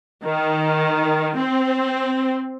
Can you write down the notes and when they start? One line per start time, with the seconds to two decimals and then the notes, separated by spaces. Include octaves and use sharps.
0.24 D#3
1.38 C4